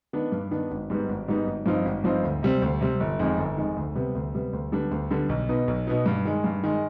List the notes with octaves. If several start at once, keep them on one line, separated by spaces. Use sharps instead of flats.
D#3 B3 D4
G2
D#3 B3 D4
G#1
G#2 G3 B3 D#4
G#1
G#2 G3 B3 D#4
G#1
G2 F3 C4 D#4
G#1
G2 F3 C4 D#4
D2
C3 G3 C4
D2
C3 G3 C4
G1
F2 D#3 G#3
G1
F2 D#3 G#3
D2
C3 G3 B3
D2
C3 G3 B3
D2
D3 G3 B3 D4
D2
D3 G3 B3 D4
B1
B2 B3 D#4
B1
B2 B3 D#4
G2
D#3 G#3
G2
D#3 G#3